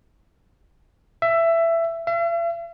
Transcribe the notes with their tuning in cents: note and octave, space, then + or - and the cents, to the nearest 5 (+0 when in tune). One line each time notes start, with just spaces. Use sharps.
E5 +15
E5 +45